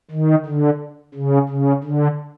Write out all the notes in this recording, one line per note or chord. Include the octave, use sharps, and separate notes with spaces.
D#3
D3
C#3
C#3
D3